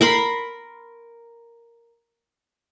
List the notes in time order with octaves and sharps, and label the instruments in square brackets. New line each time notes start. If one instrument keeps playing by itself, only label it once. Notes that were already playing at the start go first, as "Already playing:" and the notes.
[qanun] A#4 B5 C6